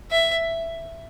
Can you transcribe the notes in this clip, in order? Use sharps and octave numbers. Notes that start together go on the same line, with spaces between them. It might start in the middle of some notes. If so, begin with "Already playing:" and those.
E5